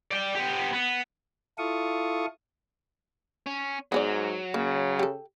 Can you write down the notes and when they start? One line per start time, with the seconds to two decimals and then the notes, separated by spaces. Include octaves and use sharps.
0.11 D5 G5
0.35 B3 G4
0.73 B3
1.58 E4 F4 A4 F5 C#6 D#6
3.46 C#4
3.92 G#2 F#3 B3 G#4 D5
4.54 C#3 A#3
4.99 G4 A4